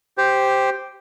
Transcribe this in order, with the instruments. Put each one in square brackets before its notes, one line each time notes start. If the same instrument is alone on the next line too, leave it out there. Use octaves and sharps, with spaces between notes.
[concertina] G4 C5